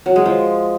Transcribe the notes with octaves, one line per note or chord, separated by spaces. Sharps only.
F#3
G#3
F3